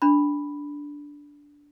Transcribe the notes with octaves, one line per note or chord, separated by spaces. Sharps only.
D4 B5